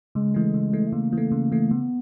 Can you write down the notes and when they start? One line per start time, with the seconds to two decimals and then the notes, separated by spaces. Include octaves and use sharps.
0.15 C#3 G#3
0.34 E3 A3
0.54 C#3
0.73 E3 A3
0.87 A3
0.92 C#3 A#3
1.12 E3
1.18 A3
1.31 C#3
1.52 E3 A3
1.71 C#3 B3